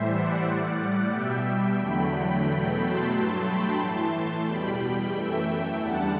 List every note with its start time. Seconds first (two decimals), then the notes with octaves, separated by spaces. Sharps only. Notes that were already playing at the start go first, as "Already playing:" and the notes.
Already playing: A2 E3 G3 C5 E5
0.11 D5 F#5
0.44 A2 G3
1.11 B2 G3 E5 G5
1.77 E2 D3 F#3 A3 G5 B5
2.44 E2 B2 F#3 A3 G5 B5
2.78 A5 C6
3.10 G2 F#3 A3
3.44 G5 B5
3.77 A2 E3 A3 A5 C6
4.44 E2 B2 G3 G5 B5
5.10 F#2 E3 A3 E5 G5
5.78 E2 D3 G3 F#5 A5